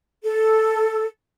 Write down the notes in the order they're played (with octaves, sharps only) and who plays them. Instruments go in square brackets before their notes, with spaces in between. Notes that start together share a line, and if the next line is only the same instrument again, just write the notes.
[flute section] A4